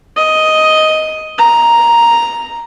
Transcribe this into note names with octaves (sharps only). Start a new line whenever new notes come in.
D#5
A#5